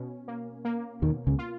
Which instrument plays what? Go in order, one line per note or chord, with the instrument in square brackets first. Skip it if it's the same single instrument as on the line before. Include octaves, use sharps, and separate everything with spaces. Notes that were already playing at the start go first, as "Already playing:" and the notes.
Already playing: [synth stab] B2 C#4
A#3
A#3
[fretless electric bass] D#2 D#3 [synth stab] B2
[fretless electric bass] C#2 C#3
[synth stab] F4